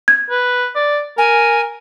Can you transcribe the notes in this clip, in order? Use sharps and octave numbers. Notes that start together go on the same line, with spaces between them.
G#6
B4
D5
A#4 G#5